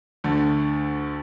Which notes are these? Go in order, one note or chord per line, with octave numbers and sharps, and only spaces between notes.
D2 D3 A3